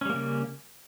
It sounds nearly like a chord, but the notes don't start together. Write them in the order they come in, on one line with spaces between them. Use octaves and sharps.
C#4 G3 A#3 C#3